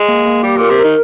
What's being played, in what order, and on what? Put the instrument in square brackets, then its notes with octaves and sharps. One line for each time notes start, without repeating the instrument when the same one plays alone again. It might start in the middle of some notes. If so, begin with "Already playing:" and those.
Already playing: [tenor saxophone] G#3
[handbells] A#3
A#3
[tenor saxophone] G3 [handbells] G4
[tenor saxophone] A#2 [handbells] A#4
[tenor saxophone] C3
[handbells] A#4
[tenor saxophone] D#3